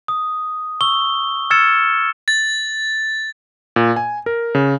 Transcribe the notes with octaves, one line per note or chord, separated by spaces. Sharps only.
D#6
C#6 E6 G7
E6 F6 G#6 A6 C#7 E7
A6
A#2
G#5
A#4
C#3